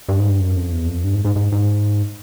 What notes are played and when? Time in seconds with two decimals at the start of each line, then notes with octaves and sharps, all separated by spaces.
0.09 G2
0.19 G#2
0.29 G2
0.40 F#2
0.56 F2
0.72 E2
0.88 F2
1.04 G2
1.14 G#2
1.25 G#2
1.36 G#2
1.52 G#2